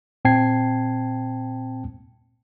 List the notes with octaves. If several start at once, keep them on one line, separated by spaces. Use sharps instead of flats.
A#2 C4 G5 A5 G#6 C7